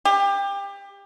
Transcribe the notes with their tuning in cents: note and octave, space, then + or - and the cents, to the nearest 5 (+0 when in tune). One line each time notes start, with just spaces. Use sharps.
G4 +25